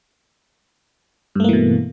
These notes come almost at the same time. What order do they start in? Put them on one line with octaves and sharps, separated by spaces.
G2 A3 A#3 E3 B2